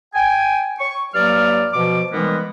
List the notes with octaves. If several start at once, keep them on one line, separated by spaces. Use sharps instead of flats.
G5 G#5
C#6
G2 F#3 A#3 D5 F6
B2 F3 D6
D#3 E3 G3 G#3 A#3 B3